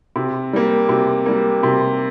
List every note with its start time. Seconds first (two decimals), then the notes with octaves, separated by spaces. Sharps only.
0.16 C3
0.53 G3 A#3
0.89 C3
1.26 G3 A#3
1.63 C3